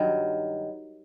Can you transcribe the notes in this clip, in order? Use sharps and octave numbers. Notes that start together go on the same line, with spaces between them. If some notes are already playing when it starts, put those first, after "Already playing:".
Already playing: G2 D#3 F#3